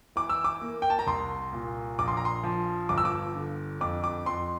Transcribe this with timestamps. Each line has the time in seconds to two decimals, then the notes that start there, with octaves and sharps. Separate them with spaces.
0.16 E3 D6
0.29 E6
0.44 D6
0.61 A#3
0.82 G5
0.90 A5
0.99 A#5
1.07 C2 C6
1.53 A#2
1.99 A#1 D6
2.08 C6
2.17 A#5
2.25 C6
2.43 F3
2.89 G1 D6
2.98 E6
3.05 D6
3.35 D3
3.81 F2 D6
4.04 D6
4.26 F2 C6